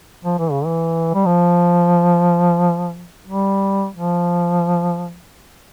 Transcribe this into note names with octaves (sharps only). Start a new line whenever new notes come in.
F3
E3
C#3
E3
G3
F3
G3
F3